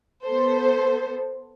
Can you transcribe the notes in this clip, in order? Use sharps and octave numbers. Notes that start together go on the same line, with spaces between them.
B3 A4 C5